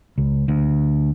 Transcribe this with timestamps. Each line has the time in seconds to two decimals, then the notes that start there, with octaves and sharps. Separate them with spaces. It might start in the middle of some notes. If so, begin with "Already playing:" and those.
0.18 C#2
0.48 D2